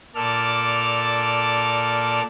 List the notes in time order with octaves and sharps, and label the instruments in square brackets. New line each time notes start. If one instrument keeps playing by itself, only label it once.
[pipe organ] A#2 A4 D5 F6